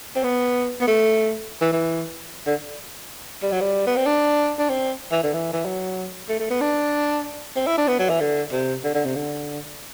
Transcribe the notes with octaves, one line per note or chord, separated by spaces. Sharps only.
C4
B3
B3
A3
E3
E3
D3
G3
F#3
G3
B3
C4
D4
D4
C4
E3
D3
E3
E3
F#3
A3
A3
B3
D4
C4
E4
D4
B3
F#3
E3
D3
C3
D3
D3
C3
D3